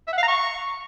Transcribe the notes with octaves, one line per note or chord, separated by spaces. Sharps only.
E5
F#5
F5
A#5
C#6